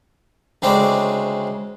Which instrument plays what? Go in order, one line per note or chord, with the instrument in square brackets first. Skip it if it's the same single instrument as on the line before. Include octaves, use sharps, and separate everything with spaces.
[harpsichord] D2 C#3 G#3 C4 D4 D6